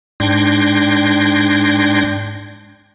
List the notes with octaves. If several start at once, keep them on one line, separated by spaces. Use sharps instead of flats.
G#2 D4 G5 C6 G#6 A#6